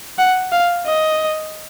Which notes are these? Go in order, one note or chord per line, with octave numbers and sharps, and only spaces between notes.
F#5
F5
D#5